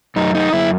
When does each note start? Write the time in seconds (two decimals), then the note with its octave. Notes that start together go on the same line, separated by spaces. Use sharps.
0.16 F#2 D#4
0.35 D#4
0.53 F#2 E4